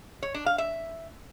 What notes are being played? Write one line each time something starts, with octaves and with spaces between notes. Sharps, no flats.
C#5
D4
F5
E5